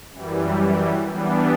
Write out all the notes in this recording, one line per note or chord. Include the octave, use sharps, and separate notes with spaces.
F#2 E3 G3
E3 G3 B3 D4